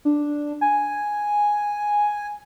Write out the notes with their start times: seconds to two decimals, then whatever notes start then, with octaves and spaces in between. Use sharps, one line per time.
0.05 D4
0.61 G#5